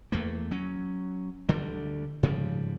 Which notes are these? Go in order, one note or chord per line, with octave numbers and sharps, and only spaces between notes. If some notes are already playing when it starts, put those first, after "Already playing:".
E2 A3 A#3
F#3 C#4
D2 D3 G3
G#2 C#3 F3 G3